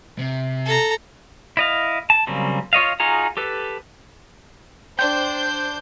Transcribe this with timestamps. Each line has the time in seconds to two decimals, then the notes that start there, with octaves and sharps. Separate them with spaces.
0.19 C3
0.66 A4 A#5
1.57 E4 D#5 F5
2.10 A5
2.27 C#3 F#3 G3 A#3 C4
2.73 F4 C#5 D#5 F5
3.00 D#4 F4 F#4 G#4 A#5
3.37 G4 A4 B4
4.99 D4 C5 G5 G6